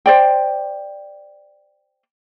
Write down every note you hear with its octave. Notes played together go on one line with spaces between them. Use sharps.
C5 D5 G5